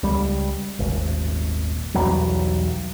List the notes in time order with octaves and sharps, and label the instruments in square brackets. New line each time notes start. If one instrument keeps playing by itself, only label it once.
[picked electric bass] C#2 G3
D#1 G#1
B1 E2 F#3 G3